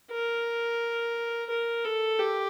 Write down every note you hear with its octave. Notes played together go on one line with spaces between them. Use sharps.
A#4
A#4
A4
G4